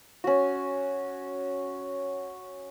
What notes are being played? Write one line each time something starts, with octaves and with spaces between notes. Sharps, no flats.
C#4 F#4